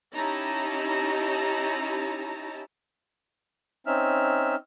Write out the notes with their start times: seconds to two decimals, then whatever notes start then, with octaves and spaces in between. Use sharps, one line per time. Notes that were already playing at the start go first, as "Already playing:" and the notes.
0.15 C#4 D#4 E4 G4 A5 A#5
3.86 C4 C#4 D#4 E5 F6